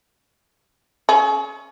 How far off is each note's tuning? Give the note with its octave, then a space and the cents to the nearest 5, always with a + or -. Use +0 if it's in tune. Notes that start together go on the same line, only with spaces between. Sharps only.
C#4 +0 G#4 +40